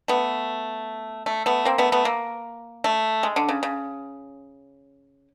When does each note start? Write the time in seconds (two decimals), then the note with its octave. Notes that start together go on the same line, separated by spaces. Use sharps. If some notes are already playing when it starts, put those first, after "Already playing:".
0.08 A3 B3
1.26 A3
1.46 A3 B3
1.65 A#3 C4
1.78 A3 B3
1.92 A3 B3
2.05 A#3
2.84 A3
3.23 G#3
3.36 D3
3.49 C#3
3.63 C#3